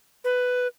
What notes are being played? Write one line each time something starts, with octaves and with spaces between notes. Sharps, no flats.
B4